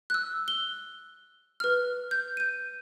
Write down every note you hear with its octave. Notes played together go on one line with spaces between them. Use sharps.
E6 F#6
G7
B4 F6
G6
G6 D#7